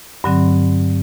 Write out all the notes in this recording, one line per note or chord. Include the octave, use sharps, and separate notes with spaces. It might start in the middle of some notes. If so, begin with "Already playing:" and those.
G2 D3 F#3 C4